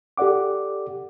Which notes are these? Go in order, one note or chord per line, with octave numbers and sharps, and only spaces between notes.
G4 A4 D5 F#5 D6